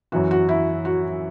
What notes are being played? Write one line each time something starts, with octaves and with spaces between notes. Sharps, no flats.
F#2 E3 F#4
F#4
E4
F#4